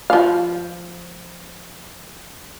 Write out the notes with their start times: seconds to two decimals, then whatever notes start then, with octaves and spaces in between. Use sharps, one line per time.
0.10 F3 F5